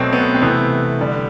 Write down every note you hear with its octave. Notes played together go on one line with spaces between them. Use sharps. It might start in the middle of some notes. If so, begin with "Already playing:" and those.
Already playing: B2 F#3 A3 C4
B3
C4
C3 E3 A3 B3
D3 G3